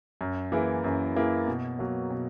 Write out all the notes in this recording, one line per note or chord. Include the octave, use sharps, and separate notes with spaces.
F#2
E3 A#3 E4 G#4
F#2
E3 A#3 E4 G#4
B2
F#3 A#3
B2